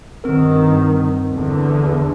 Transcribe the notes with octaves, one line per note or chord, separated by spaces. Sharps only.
G2 D#3 C4 A#4
E2 D3